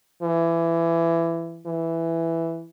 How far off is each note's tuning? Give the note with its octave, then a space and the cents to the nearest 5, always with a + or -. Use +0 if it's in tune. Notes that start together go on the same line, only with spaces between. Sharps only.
E3 +20
E3 +5